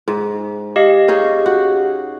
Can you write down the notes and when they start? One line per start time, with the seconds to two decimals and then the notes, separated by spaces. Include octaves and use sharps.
0.08 G#2
0.76 G4 D#5 F5
1.08 C#4 D#4 G#4
1.46 F#4